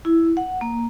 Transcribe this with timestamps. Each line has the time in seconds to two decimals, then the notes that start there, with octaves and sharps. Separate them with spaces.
0.05 E4
0.37 F#5
0.61 A#3